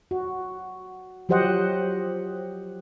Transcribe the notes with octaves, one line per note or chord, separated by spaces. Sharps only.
F#4
F3 F#3 G4 C5 D#5 F#5